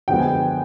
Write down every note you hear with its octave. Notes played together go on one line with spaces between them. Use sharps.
F#2 D3 F3 G#3 B3 G5
G#5